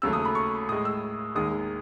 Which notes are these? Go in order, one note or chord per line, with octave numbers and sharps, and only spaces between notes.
D#2 C#3 F#3 A3 E6
D#6
B5
C#6
A2 G#3 D#6
E6
D#2 D#3 G#3 D#6